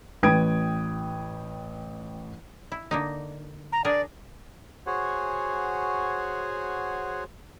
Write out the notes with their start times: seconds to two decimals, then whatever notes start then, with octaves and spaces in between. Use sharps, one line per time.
0.23 A1 B4 G5 D#6 G#6 D7
2.72 E4
2.91 D3 A#3 D#4
3.72 A#5
3.85 D4 G#4 A#4 D5
4.86 F#4 G#4 C5 C#5 F#5 G#5